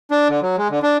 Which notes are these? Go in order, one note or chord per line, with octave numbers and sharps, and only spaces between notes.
D4
D3
F#3
G#3
D3
D4